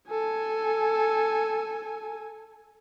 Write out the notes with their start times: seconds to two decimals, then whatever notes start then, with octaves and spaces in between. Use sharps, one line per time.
0.11 A4 G#5